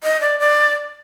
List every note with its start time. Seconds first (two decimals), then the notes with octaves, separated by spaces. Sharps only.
0.03 D#5
0.21 D5
0.40 D5